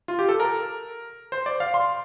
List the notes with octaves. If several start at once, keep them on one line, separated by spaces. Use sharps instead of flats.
F4
G4
A4
A#4
C5
D5
F5
C6